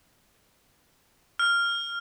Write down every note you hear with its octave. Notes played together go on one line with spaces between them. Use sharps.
F6